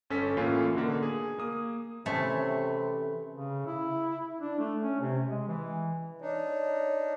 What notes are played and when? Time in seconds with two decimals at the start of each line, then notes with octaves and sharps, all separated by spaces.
0.10 G1 C#4 A4 B6
0.37 A2 E3 A3 A#3 C#4 F4
0.75 B2 D3 A#3
1.03 G#4
1.38 A#3 D#6
2.06 C3 E3 A3 C4 C#4
3.35 C#3
3.67 E4
4.41 D4
4.59 A3
4.82 C#4
5.00 C3
5.27 G#3
5.48 E3
6.21 D4 D#4 C#5